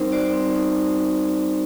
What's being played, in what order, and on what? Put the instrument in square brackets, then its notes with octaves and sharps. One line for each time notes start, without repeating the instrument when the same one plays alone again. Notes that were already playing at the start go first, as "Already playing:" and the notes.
Already playing: [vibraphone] G3 C4 D#4 A#4 C5
F#4 C5 D5
C4
D#4